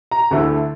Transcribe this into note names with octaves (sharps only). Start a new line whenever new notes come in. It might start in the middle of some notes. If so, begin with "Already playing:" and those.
A#5
D2 D3 A3 E4